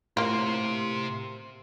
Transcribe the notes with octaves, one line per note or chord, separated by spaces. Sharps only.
A2 A#3 F4 G4 C5 C6 F6 C7